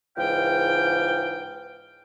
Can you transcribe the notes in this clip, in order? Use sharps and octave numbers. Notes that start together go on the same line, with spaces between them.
C#2 G#2 E3 F5 G5